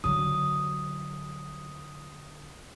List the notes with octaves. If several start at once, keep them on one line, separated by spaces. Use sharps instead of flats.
D3 F#3 D#6